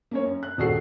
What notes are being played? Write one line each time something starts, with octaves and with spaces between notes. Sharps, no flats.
A#3 C#4 C#5
F#2
F#6
D#1 A#1 F#4 G#4 A4 C7